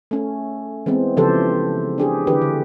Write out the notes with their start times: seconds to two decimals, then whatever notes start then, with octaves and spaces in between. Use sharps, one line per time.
0.11 A3 C#4
0.86 E3 G#3 B3 C4
1.17 C#3 E3 F3 G4 A4 C5
1.98 D4 G4 G#4
2.27 D3 E3 G4 B4
2.42 D3